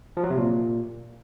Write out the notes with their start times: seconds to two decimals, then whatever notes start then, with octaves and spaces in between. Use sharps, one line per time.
0.17 F3
0.24 F#3
0.30 C3
0.37 A#2